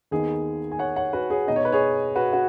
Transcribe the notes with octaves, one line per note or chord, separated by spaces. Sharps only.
D#2 D#3 B3 D#4 G#4
G#5
C#5 F#5
C#5 F#5
F#4 B4
G#4 C#5
B2 B3 D#4 D#5
C#5
B4
G#4 C#5
F#4 B4
F#4